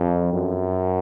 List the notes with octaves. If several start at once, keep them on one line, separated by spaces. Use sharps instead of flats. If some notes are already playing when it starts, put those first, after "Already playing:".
Already playing: F2
F#2